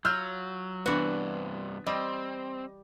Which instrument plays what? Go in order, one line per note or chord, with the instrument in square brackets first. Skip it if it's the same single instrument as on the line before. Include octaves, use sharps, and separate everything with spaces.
[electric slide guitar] F#3 [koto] F4 [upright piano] E6 F6 G6
[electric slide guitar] G2 C3 [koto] E3 F#4 [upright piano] B3 D4
[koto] G3 [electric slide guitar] C4 [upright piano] D#5